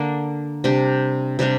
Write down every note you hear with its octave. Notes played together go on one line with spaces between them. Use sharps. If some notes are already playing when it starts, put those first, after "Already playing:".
Already playing: D3 A#3 D4
C3 G3 D4 G4
C3 G3 D4 G4